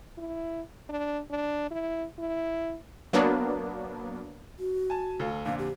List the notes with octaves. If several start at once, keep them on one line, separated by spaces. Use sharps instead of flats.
E4
D4
D4
E4
E4
F#3 A#3 B3 D4
F#4
G#5 A5
D2 A4 F5
F2 A#2 D3 F5
G4